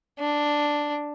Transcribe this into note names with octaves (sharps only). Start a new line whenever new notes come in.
D4